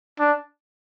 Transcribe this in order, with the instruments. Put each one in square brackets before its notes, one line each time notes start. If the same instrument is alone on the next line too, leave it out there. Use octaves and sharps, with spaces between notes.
[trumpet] D4